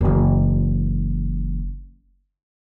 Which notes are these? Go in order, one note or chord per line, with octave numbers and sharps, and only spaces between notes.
F#1 E3